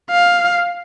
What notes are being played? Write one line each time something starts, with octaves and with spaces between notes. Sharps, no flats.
F5